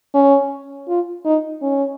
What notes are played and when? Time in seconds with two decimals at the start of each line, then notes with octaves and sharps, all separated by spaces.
0.14 C#4
0.88 F4
1.25 D#4
1.62 C#4